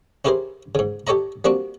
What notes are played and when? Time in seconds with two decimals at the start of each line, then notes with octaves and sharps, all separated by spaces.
0.25 C#4 E4 G4 G#4 A#4 C5
0.75 G#2 C#3
1.07 G4 A4 C#5 D#5 A#5
1.44 G3 A#3 C4 D4 F#4